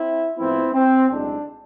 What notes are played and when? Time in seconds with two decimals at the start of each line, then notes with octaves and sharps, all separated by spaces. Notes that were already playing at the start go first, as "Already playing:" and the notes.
Already playing: C4 E4
0.37 A2 F3 B3 C4 E4
0.73 C4
1.10 B1 A2 G#3 D4